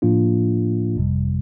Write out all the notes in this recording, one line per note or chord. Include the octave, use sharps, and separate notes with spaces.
A2 F3 A#3 D4 F4
G1 F2 C3 G3